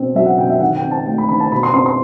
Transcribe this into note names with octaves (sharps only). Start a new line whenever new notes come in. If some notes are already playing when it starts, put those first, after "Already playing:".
Already playing: B2 C4
F#3 E5
F#5
B2 G5
E5
D#3 F#5
G5
C4
A5
A3 G5
B5
D#3 B5
A5
B2 B5
C6
C4 C6
C6